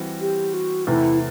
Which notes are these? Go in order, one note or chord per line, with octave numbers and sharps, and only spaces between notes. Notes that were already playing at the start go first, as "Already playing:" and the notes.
Already playing: E3 G3 C4 F#4
G4
F#4
E2 C3 E3 A3 E4